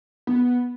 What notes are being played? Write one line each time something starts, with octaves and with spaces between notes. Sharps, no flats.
B3